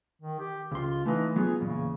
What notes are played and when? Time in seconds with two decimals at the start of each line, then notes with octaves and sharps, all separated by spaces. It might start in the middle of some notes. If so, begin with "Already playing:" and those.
0.22 D#3
0.39 G4
0.72 C#2 F4 C6
1.06 E3 A3 D#4
1.36 F#3 B3 F4 G#4
1.61 E2 A#2 C#3